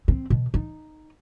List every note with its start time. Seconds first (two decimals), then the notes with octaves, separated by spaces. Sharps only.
0.08 C4
0.30 B2
0.54 D#4